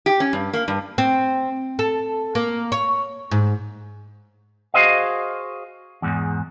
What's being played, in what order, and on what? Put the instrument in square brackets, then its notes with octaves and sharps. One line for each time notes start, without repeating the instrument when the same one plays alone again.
[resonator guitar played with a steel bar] G4
C#4
G2
A#3
G2
[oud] C4
A4
A#3
C#5
G#2
[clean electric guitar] F#4 G#4 A4 C5 D#5 F5
E2 G#2